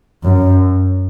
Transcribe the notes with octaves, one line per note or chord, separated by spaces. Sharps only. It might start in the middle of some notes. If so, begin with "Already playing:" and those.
F#2